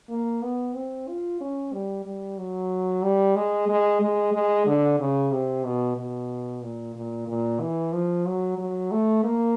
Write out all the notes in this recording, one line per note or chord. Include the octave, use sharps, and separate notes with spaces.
A#3
B3
C4
F4
C#4
G3
G3
F#3
G3
G#3
G#3
G#3
G#3
D3
C#3
C3
B2
B2
A#2
A#2
A#2
E3
F3
F#3
F#3
A3
A#3